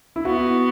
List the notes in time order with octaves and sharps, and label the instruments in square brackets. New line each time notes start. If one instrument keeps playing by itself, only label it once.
[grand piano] E4
[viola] B3 [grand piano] F#4